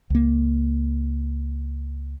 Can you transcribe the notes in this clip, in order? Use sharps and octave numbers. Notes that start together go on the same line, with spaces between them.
C#2 A#3